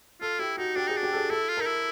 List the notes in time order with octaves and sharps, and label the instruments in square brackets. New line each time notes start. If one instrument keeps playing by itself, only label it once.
[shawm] F4 [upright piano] A4
[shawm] E4 [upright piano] G4
[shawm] D#4 [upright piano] F#4
[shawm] D4 [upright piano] G4
[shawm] D#4 [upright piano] G#4
[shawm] D4
[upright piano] G4
A4
G#4
[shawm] E4 [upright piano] A4
[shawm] F4
[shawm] D#4 [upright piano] A#4
[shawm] E4